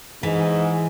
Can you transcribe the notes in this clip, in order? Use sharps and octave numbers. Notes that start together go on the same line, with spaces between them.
G#2 E3